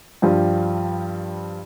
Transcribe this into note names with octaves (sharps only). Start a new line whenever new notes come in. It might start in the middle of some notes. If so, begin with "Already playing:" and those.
G2 F3 G3